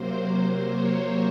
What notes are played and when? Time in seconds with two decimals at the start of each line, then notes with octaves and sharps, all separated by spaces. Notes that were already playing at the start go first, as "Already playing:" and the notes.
Already playing: C3 F#3 A#3 C5
0.64 C#5